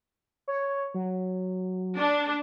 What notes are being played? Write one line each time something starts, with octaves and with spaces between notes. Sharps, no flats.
C#5
F#3
D4